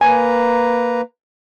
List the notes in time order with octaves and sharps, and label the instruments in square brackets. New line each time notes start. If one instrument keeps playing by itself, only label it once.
[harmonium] A#3 B4 A#5 [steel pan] G#5